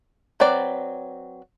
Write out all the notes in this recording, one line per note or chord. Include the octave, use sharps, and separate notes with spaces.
F#3 C4 B4 D5